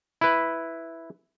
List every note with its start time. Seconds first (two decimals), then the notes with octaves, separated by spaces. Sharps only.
0.21 E4 B4